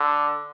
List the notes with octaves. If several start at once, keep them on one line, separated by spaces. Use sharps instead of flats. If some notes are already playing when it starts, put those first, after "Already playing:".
Already playing: D3